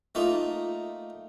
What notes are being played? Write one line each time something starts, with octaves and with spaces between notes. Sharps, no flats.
A3 A#3 D#4 F4